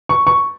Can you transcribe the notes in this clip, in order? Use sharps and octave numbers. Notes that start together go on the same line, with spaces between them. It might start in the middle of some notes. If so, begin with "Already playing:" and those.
C#6
C#6